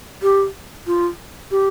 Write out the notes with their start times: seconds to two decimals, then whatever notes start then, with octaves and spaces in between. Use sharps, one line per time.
0.22 G4
0.87 F4
1.51 G4